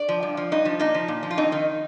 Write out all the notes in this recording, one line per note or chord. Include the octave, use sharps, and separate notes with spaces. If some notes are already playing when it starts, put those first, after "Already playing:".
Already playing: D5
F3
G2
F3
G2 D#4
F3
A#2 D#4
F3
A#2
F3
F4
F2 D#4
D#3